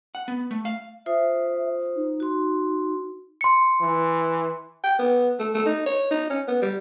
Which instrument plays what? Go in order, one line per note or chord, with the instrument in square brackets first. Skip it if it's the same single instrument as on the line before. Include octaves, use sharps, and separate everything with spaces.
[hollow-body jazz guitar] F#5
B3
A3
F5
[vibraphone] F4 C5 D#6 [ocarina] E5
[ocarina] D#4
[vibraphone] F#4 C6
[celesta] C6 C#7
[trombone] E3
[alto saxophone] G5
B3
A3
A3
D#4
C#5
D#4
C#4
B3
G3